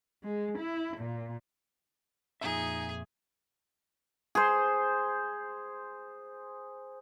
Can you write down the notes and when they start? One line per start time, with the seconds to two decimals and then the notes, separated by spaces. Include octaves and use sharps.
0.24 G#3
0.59 E4
0.97 A#2
2.41 F2 A#2 D#4 G#4 E5 G#5
4.35 G#4 C5